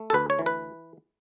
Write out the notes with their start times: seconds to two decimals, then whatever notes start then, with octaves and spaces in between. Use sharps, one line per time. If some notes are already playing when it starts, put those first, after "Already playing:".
Already playing: A3
0.10 A4
0.13 D2 B4
0.30 C#5
0.39 E3
0.46 B4